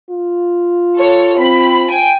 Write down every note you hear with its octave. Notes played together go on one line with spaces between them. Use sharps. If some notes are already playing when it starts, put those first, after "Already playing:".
F4
A4 C#5
C4 B5
G5 G#5 D7